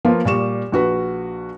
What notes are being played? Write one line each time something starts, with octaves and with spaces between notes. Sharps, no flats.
F3 A#3 F4 B4
A#2 G3 C#6 E7
A#1 F#4 B4